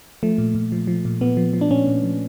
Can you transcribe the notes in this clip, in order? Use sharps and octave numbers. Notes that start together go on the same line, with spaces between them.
F3 A3
A#2
A#2
F3
F3
A#2
A#2 B3
F3
F3
D4
A#2 C#4
A#2
F3